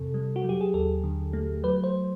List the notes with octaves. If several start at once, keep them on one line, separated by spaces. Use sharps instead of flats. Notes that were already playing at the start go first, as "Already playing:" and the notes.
Already playing: F2 C3 A4
G3
F#4
F#3 G4
G#4
D#2 A4
D3
A3
F#3 B4
C5